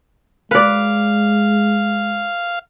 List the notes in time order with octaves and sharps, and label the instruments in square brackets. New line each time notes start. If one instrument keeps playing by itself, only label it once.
[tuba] G#3 [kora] B4 D5 [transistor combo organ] F5